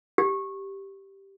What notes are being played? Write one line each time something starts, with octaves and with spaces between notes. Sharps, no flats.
G4